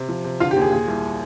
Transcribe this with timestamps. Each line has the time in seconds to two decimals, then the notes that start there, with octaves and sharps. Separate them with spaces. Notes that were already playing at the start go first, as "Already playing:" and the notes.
Already playing: C3
0.09 F3
0.24 C3
0.40 D3 F4 F5
0.51 G4
0.56 D#2 G#4
0.72 A#2 G#4
0.88 C2